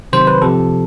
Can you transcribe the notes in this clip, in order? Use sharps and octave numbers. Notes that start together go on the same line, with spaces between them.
C3 D#3 F#3 C5
B4
C3 F3 A4